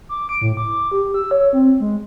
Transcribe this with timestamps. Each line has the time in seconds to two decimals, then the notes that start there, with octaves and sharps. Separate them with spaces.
0.09 D6
0.29 D7
0.41 A2
0.57 D6
0.91 G4
1.14 E6
1.31 C#5
1.53 C4
1.80 G#3